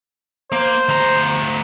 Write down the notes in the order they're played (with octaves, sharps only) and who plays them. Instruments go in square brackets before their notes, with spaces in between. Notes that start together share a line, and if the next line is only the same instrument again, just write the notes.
[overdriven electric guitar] A#3 [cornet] C5
[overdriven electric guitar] D2 A#5